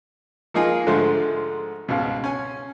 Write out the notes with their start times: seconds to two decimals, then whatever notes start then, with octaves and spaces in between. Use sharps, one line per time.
0.54 F3 A#3 D#4 F4 G#4 A#4
0.87 G#2 D3 F3 A3 C5
1.88 C#2 G#2 B2
2.24 C#4 G#5